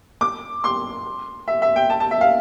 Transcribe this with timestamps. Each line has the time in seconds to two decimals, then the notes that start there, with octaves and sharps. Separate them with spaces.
0.21 D6
0.64 C6
1.48 E5
1.62 E5
1.76 G5
1.90 A5
2.00 A5
2.11 E5
2.21 F5